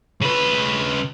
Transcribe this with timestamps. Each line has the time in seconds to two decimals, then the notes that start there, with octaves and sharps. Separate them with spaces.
0.22 C#3 B4